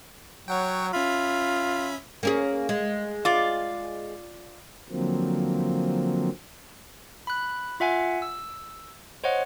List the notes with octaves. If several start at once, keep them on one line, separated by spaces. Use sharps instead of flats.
F#3 C#5 F#5 G5
C#4 F4 E5 B5
A#3 C#4 G#4
G#3
F4 D5
D3 F3 F#3 A#3 C4
B5 F#6
F4 E5 F#5 G#5
E6
C5 C#5 D#5 F#5